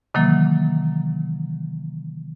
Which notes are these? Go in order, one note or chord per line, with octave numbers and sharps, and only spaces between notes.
C3 D#3 E3 F#3 A#3